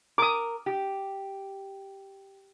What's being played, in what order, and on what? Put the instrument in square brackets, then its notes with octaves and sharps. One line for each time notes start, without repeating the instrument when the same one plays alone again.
[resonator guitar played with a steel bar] A#4 [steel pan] D6 D#6
[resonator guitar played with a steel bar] G4